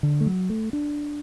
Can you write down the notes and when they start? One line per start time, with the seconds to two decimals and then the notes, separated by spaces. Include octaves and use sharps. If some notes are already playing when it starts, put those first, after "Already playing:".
0.03 D3
0.21 A3
0.26 F#3
0.50 A3
0.73 D4